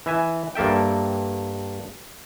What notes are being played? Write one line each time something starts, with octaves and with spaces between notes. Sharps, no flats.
E3 E5 G#5
G2 A#3 A4 E5 G5